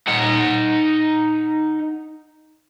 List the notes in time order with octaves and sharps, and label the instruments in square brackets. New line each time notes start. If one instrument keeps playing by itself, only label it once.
[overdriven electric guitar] D#4 F#5